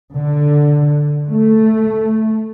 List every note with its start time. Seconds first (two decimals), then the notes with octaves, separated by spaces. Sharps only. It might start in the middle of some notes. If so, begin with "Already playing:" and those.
0.13 D3
1.28 A3